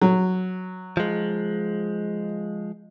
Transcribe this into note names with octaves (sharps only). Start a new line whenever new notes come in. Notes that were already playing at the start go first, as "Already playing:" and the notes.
F#3
F3 G#3